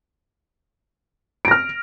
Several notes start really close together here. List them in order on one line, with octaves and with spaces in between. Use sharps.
D7 A#6 F6